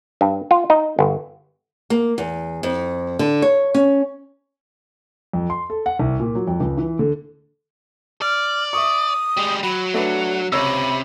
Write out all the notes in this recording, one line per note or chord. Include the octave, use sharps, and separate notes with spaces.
G2
F4
D#4
G1
A#3
E2
F2
D3
C#5
C#4
F2
C6
A4
F#5
C2
A#2
F#3
F2
C#2
E3
D3
D5 F6
E5 C#6 D#6
G3 G#3
F#3 B5
A3 D4 B4 F#5
C#2 C3 C#5 B5 E6